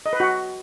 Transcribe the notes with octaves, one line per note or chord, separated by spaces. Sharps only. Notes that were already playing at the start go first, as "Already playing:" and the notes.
D#5
B4
F#4